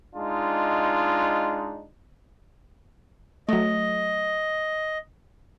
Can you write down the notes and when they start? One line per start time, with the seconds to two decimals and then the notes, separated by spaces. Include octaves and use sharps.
0.15 G#3 D4 D#4 F4
3.49 F#3 A3 D#5